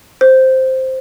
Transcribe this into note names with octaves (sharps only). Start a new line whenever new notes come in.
C5